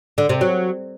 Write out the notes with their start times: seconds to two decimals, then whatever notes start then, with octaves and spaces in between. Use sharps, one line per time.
0.18 D3
0.29 C3
0.41 F#3